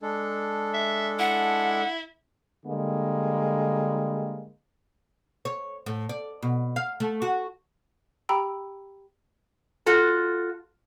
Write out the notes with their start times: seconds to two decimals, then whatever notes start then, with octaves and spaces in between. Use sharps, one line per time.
0.02 G#3 D4 A4
0.74 E5
1.19 E4 F#5
2.66 D3 G3 G#3 A#3
5.45 C#5
5.86 A2
6.09 D5
6.42 B2
6.76 F5
7.00 A3
7.22 F#4
8.29 G4 G5 A#5 B5 E6
9.86 F4 F#4 A4